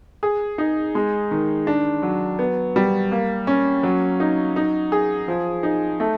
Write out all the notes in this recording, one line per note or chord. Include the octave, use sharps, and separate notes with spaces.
G#4
D#4
G#3
D#3
D4
F#3
B3
G3
A#3
C#4
F#3
D#4
D#4
G#4
F3
D#4
A3